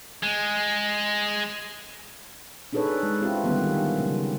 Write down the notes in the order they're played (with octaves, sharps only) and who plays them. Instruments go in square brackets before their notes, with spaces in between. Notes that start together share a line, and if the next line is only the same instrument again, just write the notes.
[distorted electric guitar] G#3
[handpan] D4 D#4 G#4 A4 B4 C#5
G#3
C4 C#4 E4 F4 G4 B4
D3 D#3 G3 A#3 B3 C#4
D#3
C#3 F#3